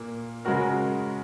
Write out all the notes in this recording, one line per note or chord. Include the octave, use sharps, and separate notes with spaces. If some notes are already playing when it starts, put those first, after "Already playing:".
Already playing: A#2 A#3
C#3 G#3 F#4 A#4